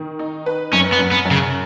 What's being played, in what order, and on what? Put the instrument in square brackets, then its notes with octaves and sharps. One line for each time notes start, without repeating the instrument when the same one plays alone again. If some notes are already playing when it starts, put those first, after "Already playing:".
Already playing: [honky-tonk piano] D#3
D#4
B4
[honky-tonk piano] F#2 [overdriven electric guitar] C#4
[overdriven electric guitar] B3
[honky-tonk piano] F#2
[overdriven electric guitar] B3
[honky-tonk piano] F#2
[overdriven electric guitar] C#3